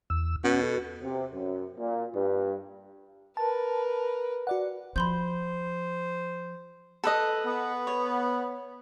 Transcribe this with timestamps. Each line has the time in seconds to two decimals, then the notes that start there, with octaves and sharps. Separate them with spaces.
0.10 E2 E6
0.44 B2 C#4 F#5
0.63 F#4 A4
1.02 C3
1.32 F#2
1.79 A#2
2.14 G2
3.37 A#4 B4 A5
4.47 F#4 D5 F#5
4.96 F3 C5 B5 C6 G6
7.04 A4 B4 D#5
7.46 B3
7.87 C#5